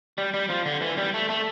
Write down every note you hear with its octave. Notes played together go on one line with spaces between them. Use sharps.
G3
G3
F3
D3
E3
G3
A3
A3